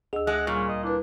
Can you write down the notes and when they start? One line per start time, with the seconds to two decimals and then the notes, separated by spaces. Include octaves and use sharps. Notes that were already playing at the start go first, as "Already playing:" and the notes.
0.13 D2 G#4 D#5 E6
0.27 G#3 F#5
0.47 A#2 G3 C#4
0.69 D#5
0.83 D4 E4 B4